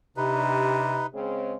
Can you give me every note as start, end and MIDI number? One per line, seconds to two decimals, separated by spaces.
0.17 1.08 48
0.17 0.93 62
0.17 1.06 63
0.17 0.93 67
0.17 1.06 71
1.13 1.55 49
1.13 1.55 56
1.13 1.55 60